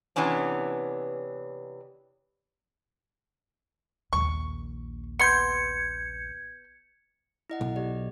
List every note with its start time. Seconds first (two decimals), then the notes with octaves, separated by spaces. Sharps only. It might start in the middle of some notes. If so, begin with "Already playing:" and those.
0.16 C3 E3 B3 C#4 D4
4.13 A#1 D#2 C#6
5.19 B3 C6 G6 G#6 C#7
7.50 E4 D#5 F#5
7.61 B1
7.76 G4 D5 D#5